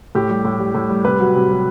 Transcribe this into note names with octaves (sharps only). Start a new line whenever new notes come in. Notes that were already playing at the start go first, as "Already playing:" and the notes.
A2 G4
G3
A2
G3
A2
G3
C3 B4
F#3
C3
F#3